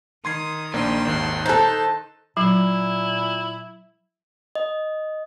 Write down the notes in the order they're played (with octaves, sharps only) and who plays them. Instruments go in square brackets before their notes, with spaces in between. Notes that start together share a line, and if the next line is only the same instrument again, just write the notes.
[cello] D#3 [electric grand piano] C6 G#6 C7 [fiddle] D#6
[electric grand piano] A#1 A#3 D4 [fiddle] G5 C6
[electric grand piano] G#1 D#2
[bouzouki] D#4 A4 [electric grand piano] C5 F#6 [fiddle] A5
[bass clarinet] A#2 [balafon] F#3 [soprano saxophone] E4
[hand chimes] D#5